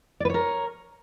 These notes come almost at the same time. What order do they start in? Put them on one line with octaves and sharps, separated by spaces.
D5 B4 C#5 A#4